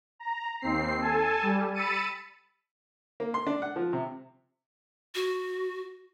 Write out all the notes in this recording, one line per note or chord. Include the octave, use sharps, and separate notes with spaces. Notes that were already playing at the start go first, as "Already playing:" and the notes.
A#5
D#2 C4 C7
A4 G#5 A5
G3
B5 E6 A6 C#7 D#7
A#3
C6
D4
F#5
F3
C3
F#4